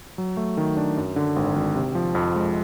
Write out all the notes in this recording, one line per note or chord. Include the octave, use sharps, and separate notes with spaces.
F#3
A3
D#3
D4
F#2
D3
G#1
G#1
C3
F3
F2
G#3